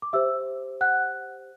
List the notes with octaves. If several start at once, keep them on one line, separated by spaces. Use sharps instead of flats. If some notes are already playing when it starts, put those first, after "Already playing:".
D6
G4 C5 E5 E6
F#5 F#6